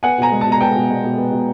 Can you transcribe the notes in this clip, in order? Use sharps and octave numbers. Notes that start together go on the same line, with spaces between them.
B3 F#5 G#5
B2 G#5 A#5
G#3
A5
B2 A#5
B3 G5 A5
B2
G#3
B2
B3
B2